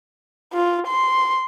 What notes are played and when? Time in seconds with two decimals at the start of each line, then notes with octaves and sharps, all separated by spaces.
0.53 F4
0.87 C6